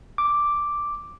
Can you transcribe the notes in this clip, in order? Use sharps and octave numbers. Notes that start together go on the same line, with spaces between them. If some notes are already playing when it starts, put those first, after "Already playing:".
D6